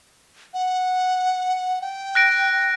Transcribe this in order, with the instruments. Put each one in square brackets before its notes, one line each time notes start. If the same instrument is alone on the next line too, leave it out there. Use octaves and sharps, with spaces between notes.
[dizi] F#5
G5
[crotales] F#6 A#6 D7